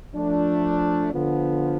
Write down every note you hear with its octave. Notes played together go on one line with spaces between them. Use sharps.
F3 A3 D4
D3 F3 B3 F4